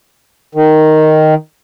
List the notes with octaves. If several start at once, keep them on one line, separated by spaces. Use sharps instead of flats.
D#3